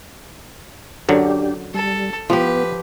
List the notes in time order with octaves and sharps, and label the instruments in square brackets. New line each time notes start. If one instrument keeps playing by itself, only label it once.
[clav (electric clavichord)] F#2 D3 F#3 [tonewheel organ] D4 G4
[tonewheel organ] G3 [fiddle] A4
[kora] F3 G4 [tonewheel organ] B3 [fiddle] B4